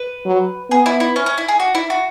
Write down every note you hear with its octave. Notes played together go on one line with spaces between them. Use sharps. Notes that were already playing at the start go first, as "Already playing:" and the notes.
Already playing: B4
F#3
B3 G#4
E4
E4
C#4
C#4
E4
G#4
F#4
E4
F#4